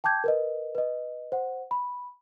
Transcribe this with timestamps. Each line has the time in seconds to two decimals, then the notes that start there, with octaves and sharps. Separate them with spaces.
0.04 G5 A5 D6 G6 G#6
0.24 A#4 B4 D#5
0.75 B4 D#5
1.32 C5 F#5
1.71 B5